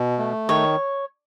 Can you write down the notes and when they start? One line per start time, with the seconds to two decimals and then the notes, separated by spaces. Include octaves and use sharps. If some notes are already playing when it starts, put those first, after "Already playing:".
Already playing: B2
0.19 A3
0.49 D#3 C#5